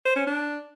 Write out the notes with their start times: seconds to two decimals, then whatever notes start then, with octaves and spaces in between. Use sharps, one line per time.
0.05 C5
0.16 C#4
0.27 D4